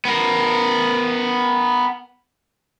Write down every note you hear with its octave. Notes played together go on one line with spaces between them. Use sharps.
B3 A#4